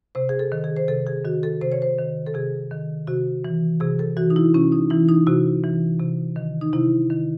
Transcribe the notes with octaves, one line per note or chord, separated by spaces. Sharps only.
C3 C5
G#4
A4
D#3
G#4
C5
C3 A4
G#4
D#3 F#4
A4
C3 C5
C#5
C5
D#3
A4
C3 G#4
D#3
C3 F#4
E3
C3 G#4
A4
E3 F#4
D#4
E4
C3 C#4
D#4
E3 E4
D#4
C3 F#4
E3
C3
D#3
D#4
C3 E4
D#3